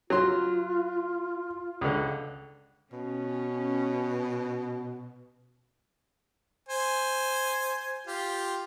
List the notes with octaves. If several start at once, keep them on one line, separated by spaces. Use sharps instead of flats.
F#3 F4 C6
C#2 D3
B2 C#4
C5 G#5
F4 G4